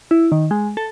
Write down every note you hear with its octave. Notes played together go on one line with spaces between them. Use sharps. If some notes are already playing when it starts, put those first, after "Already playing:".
E4
D#3
G#3
A4